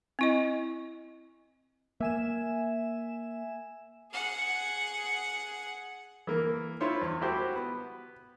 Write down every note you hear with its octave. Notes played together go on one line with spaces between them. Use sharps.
C4 E4 D#5
A#3 E5 G#5 E7
G#4 F#5
E3 A#3
E4 F4 C5 C#5 C6
E2
E4 F#4 G4 C5
B3